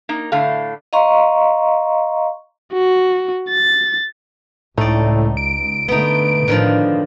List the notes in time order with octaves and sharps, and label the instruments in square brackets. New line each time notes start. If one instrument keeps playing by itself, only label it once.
[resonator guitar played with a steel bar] A#3 D#4
A2 D3 A3 F5
[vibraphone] D#5 F5 A#5 C6 C#6
[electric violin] F#4
A6
[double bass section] C#2 [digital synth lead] A2 [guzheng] D#4 D5
[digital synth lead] D7
[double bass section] D3 A3 [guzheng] B3 D#4
[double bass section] A2 [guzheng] D3 D#3 F3